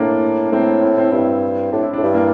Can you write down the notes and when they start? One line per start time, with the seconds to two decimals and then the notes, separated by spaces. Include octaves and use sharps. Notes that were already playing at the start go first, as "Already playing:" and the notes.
Already playing: A2 A#3 D4
0.46 D4
0.52 A2 A3 C4
0.82 C4 E4
0.97 C4 E4
1.12 G2 C4 E4
1.72 A2 D4
1.83 E4
1.93 A2 D4
2.03 G2 E4
2.14 A#3 D4